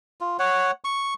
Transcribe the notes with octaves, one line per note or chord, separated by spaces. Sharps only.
F4
C#5 F#5
C#6